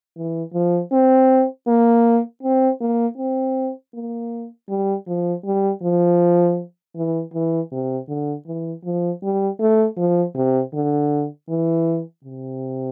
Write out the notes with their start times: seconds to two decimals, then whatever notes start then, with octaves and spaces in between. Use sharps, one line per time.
0.17 E3
0.53 F3
0.92 C4
1.68 A#3
2.43 C4
2.81 A#3
3.18 C4
3.94 A#3
4.69 G3
5.07 F3
5.45 G3
5.82 F3
6.95 E3
7.34 E3
7.72 C3
8.08 D3
8.46 E3
8.84 F3
9.23 G3
9.59 A3
9.97 F3
10.35 C3
10.74 D3
11.48 E3
12.24 C3